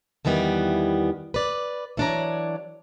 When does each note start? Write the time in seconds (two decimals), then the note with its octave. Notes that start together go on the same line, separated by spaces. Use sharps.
0.25 E2 D#3 E3 G3 B3
1.34 B4 D5
1.97 E3 F#3 D4 C#5 D5 A#5